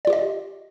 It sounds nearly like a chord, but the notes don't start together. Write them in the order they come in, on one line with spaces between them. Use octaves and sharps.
D5 F4 G4 D#5